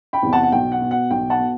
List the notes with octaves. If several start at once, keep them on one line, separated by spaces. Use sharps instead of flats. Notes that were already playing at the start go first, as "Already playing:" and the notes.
G5 B5
E2 C3 E3
F#5 A5
F#5
B1 G5
F#5
B2
F#5
B1 G5
F#5 A5
B2